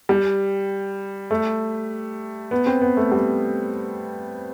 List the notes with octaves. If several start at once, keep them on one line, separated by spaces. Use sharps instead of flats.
G3
A3
B3
C4
B3
A3
G3